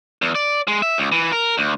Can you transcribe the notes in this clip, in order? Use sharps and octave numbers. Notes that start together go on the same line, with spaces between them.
E2
D5
G#3
E5
C#2
E3
A#4
D2